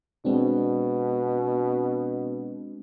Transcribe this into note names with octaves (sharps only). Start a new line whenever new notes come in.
B2 G#3 C4 D4